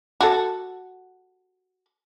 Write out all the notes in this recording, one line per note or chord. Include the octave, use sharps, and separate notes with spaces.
F#4 A4